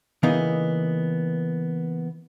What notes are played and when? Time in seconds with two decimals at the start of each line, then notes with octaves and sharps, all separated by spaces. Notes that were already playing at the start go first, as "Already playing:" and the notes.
0.23 C#3 E3 A#3 B3 D#4